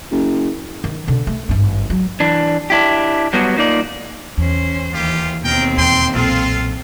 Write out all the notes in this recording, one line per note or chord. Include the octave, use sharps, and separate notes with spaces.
F#1
D#3
B2 D3
A3
G#1 G2
F#3
E3 D4
D4 E4 G4
F#3 G3 B3 F#4
A#3 D#4 F4 D5
E2 C#4 C5
D#2 E3 F4 G4
D#2 B2 C4 A#4 G5
E2 G5 C6
B1 A#2 C4 F4 A4